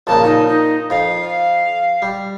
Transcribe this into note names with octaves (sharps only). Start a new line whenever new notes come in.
A#1 C#3 A#3 A5
A#2 D#4
D#4
F2 F5
G3